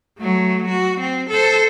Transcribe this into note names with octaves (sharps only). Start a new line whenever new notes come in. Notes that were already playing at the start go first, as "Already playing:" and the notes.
F#3 A3
F#4
C4
A4 C5